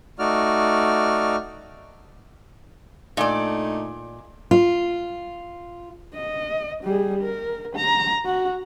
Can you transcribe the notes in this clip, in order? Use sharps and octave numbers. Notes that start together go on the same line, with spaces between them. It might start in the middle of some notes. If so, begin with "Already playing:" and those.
A3 D#4 F#4 D5 F6
A#2 A3 D4 D#4 D5
F4
D#5
G3 G#4
A#4
A#5
F#4